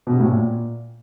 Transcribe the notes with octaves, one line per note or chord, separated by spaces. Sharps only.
B2
C3
A2
A#2